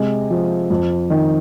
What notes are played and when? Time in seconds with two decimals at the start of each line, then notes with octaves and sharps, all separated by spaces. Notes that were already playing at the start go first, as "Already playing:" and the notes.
Already playing: C3 G#3
0.30 F3
0.70 F2
1.10 D#3